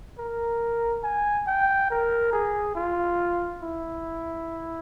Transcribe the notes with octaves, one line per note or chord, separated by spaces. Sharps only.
A#4
G#5
G5
A#4
G#4
F4
E4